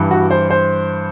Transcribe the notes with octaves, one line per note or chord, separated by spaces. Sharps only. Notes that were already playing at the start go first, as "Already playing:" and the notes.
Already playing: G2 E3
F#4
C5
C5